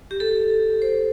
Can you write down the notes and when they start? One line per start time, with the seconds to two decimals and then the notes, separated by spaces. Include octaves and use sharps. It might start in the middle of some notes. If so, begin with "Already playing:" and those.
0.11 G4
0.20 A4
0.82 C5